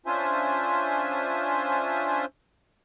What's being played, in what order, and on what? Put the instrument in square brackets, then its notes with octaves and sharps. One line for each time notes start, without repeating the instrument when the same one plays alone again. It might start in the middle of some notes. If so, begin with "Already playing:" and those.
[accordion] C#4 D4 F4 C5 E5 G#5